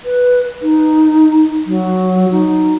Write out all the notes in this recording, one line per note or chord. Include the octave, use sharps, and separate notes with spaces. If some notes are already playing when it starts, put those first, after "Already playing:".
B4
D#4
F#3
D#4